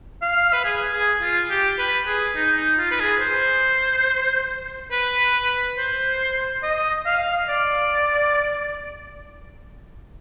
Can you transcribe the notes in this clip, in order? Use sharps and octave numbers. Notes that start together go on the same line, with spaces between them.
F5
B4
G#4
G#4
F4
G4
B4
G#4
D#4
D#4
F4
B4
G#4
C5
B4
C5
D#5
F5
D5